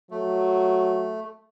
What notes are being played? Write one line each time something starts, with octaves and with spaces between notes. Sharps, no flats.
F#3 A3